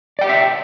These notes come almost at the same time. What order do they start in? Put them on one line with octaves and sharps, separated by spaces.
D5 G5 G4 F#5 E5